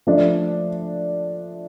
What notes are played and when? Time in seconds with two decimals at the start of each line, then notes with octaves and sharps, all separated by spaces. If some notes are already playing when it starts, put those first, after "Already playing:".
0.07 F3 A3 D4